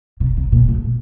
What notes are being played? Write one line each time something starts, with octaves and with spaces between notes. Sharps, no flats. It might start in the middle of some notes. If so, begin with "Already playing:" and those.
C3
C3
A#2
A2